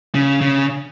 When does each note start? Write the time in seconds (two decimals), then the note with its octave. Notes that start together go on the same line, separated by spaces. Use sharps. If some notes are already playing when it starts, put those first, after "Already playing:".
0.15 C#3
0.41 C#3